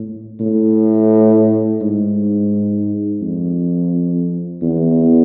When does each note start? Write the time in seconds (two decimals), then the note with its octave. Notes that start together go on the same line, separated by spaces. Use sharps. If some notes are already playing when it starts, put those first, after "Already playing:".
Already playing: A2
0.40 A2
1.81 G#2
3.21 F2
4.62 E2